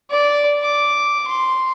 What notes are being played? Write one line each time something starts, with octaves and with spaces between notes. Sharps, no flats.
D5
D6
C6